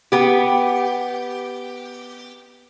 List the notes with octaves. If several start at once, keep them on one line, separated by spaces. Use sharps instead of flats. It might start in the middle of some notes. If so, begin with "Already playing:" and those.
B3 G4